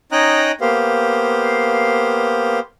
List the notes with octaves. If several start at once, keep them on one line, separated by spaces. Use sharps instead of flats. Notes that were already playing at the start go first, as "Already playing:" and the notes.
C#4 D#4 D#5 G5 A#5 F#6
A#3 B3 G4 C5 F5